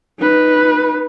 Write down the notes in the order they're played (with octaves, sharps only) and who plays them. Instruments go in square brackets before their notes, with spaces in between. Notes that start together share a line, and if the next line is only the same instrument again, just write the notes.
[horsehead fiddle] D#4 B4